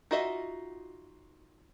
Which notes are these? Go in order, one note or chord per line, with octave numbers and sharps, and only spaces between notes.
D#4 F4 F#4 D#5 E5